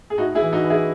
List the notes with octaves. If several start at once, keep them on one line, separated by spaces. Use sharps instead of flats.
G#4
A2 D#4 F#4
E4 G#4
E3
D#4 F#4
E3
E4 G#4